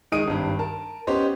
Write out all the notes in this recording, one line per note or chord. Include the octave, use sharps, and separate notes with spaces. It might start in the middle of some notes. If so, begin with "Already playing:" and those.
D#3 G#3 D#5 D#6 D7 D#7
G#1 G2
A#4 A5
B3 C#4 G4 C5 D#5